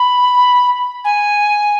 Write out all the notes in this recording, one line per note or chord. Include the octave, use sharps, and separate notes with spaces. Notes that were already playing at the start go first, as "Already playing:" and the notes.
Already playing: B5
G#5